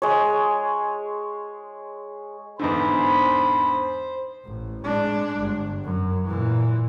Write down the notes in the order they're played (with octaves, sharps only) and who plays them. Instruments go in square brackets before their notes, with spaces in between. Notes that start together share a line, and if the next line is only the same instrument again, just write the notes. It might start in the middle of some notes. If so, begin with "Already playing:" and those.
[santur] G#3 C#5
[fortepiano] E2 G#2 D3 [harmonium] C5 [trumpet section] B5 C6
[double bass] A1
G#3 D4
G1
F#2
A#2 E3